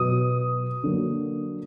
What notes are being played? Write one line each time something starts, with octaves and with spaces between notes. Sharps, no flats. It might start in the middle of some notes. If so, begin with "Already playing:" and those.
Already playing: B2 F#3 B3 D#6
D3 F#3 A#3